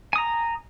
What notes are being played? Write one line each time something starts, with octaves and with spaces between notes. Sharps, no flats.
G#5 A#5 D#6